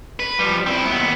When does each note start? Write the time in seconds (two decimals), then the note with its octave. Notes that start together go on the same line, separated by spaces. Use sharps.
0.20 B4
0.39 F3 G3
0.67 C4 E4
0.85 D#2 B3